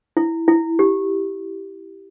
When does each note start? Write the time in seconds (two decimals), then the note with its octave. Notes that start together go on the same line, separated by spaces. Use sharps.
0.17 E4
0.48 E4
0.79 G4